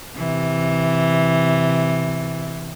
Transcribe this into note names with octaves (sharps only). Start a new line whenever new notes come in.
C3 E3